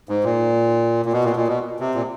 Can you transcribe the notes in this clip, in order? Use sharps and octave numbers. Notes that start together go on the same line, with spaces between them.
G#2
A#2
A#2
B2
A#2
B2
A#2
B2
C3
A#2